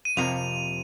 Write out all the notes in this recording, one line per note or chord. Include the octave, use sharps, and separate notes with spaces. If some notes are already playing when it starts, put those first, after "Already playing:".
D#7
F2 C3 F3 A#3 F7